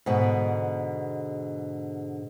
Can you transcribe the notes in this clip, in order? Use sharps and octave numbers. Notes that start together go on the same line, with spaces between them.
G#2 B2 D3